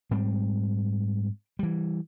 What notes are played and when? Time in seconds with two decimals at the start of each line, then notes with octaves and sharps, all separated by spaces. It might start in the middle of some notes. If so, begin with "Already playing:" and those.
0.11 G#2 G3 C4
1.59 E3 G3